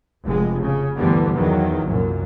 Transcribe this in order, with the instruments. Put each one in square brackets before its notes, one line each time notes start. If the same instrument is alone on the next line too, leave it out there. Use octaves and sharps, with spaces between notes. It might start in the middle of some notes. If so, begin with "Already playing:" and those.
[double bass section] F1 G#3
C#3
D2 G2 D3 E3 G3 B3
E2 D#3 E3 F#3
C2 F#2 A#2